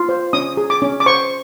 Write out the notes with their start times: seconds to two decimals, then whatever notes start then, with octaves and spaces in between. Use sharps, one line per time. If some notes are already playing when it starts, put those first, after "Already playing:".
Already playing: F4
0.09 C5
0.33 C#4 D#6
0.57 G#4
0.70 D6
0.82 C#4
1.00 D6
1.06 C5 C#6